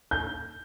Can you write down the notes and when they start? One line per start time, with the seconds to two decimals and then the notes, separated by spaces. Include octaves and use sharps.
0.11 G6